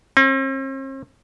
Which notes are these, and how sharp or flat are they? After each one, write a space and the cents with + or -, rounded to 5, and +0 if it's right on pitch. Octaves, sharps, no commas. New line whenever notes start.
C4 +45